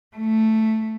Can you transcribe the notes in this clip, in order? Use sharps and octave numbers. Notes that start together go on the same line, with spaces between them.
A3